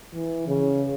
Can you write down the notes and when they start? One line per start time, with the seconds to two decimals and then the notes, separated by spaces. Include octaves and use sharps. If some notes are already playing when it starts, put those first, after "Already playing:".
0.13 E3
0.47 C#3